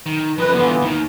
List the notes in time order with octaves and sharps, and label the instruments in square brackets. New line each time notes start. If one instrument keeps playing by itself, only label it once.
[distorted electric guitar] D#3
[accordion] F#2 B4 [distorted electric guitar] F3 D#5
[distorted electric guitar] D3 F4 [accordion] E3 B3
[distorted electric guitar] D#2 D#3